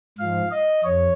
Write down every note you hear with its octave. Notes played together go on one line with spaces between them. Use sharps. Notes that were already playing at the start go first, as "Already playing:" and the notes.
G#2 F3 F5
D#5
F2 C#5